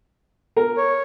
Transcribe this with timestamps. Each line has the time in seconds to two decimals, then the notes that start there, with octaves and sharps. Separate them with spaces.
0.57 A#4
0.77 C#5